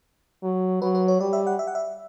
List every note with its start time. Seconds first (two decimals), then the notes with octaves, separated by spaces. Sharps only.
0.43 F#3
0.82 F#3 B4
0.95 B4
1.08 C#5
1.20 G3 D5
1.33 E5
1.47 F#5
1.59 E5
1.67 F#5
1.75 E5